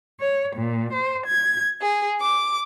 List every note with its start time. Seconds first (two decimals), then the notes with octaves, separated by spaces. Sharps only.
0.21 C#5
0.56 A#2
0.93 C5
1.27 G#6
1.81 G#4
2.20 D6